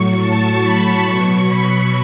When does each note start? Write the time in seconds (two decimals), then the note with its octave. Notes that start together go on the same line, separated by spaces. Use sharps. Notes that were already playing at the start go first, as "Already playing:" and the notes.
Already playing: A2 F#3 C#6
0.19 A5
0.61 B5
1.03 B2 F#3 C#6
1.45 B5